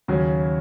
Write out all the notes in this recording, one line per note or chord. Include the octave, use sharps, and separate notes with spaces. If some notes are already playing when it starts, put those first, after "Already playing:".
D#2 C#3 F#3 C#4 F#4